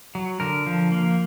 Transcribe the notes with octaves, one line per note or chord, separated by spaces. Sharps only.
F#3
D3 A#4
F3
A#3